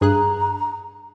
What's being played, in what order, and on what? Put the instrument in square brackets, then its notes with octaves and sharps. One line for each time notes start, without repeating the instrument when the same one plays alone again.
[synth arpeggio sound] G2 G#4 F#6 [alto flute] A#5